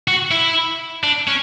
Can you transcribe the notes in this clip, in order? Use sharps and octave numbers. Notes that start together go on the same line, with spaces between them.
F#4
E4
D4
C#4